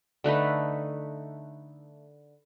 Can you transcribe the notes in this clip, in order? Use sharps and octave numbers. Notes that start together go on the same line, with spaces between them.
D3 A3 D#4 B4